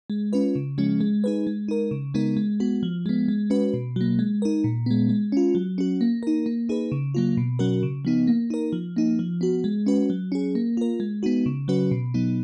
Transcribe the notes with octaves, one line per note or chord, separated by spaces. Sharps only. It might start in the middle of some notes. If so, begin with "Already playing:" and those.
G#3
C#4 F4 B4
C#3
F3 G#3 C#4
G#3
D#4 G#4 B4
G#3
D#4 A#4
C#3
G#3 B3 D#4 A#4
G#3
B3 F#4
F3
G#3 B3
G#3
C#4 F#4 B4
B2
F#3 A#3
G#3
D#4 A#4
A#2
G#3 B3
G#3
C#4 F4
F#3
C#4 F#4
A#3
D#4 A#4
A#3
D#4 G#4 B4
C#3
F#3 A#3 F4
B2
F#3 C#4 F#4 A#4
C#3
F3 B3 D#4
A#3
D#4 A#4
F3
A#3 D#4
F3
B3 F#4
G#3
C#4 F#4 B4
F#3
C#4 G#4
A#3
F4 A#4
G#3
B3 D#4 F#4
C#3
F#3 C#4 F#4 B4
B2
F#3 B3 D#4